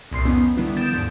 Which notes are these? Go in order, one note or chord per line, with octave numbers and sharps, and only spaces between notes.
C2 A#2 C6 C7
F2 F3 B3 C#4 D#4
D3 D#3 G3 B3 D4 E4
D#6 G6 A6 D7 E7
D#2 G#2 D3 F3